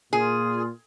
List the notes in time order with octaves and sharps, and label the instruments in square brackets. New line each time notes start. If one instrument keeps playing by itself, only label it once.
[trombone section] A#2 [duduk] F4 [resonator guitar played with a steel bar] G#4